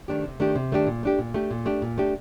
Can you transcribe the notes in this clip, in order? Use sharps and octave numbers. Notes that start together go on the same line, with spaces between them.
D#3 A3 D4 G4
C3
D#3 A3 D4 G4
C3
D#3 A3 D4 G4
A#2
A3 D4 G4
A#2
A3 D4 G4
A#2
A3 D4 G4
A#2
A3 D4 G4